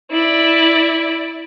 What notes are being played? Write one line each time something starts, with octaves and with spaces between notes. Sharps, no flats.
E4 D5